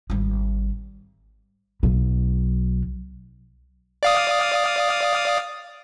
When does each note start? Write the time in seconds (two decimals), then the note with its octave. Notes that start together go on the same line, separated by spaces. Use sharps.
0.10 G#1 G3
1.83 B1 F#3
4.03 D5 F5 D#6